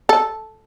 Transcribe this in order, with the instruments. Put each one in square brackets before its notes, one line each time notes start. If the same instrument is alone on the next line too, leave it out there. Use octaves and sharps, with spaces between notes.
[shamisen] A4